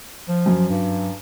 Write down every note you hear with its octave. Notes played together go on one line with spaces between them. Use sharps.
F3
F#2
G2